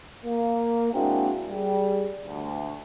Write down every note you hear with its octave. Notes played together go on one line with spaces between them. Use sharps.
A#3
G#3 A#3 C4 D4 E4 F#4
G3 G#4
D2